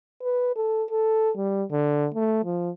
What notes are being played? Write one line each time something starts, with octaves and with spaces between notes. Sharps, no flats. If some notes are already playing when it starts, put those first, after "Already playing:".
B4
A4
A4
G3
D3
A3
F3